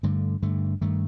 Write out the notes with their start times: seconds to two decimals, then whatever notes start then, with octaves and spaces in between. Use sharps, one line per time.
0.03 G2 D3 A3
0.43 G2 D3 A3
0.81 G2 D#3 A3